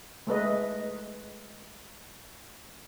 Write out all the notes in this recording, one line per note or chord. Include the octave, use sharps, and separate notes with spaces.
G#3 A3 B4 D#5